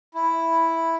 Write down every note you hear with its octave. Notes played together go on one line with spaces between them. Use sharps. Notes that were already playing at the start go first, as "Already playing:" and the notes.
E4